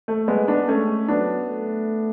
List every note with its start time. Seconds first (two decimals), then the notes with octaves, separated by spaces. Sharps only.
0.08 A3
0.28 G#3 B3
0.48 B3 D4
0.68 G#3 A3 C#4
1.08 F#3 B3 D4
1.49 A3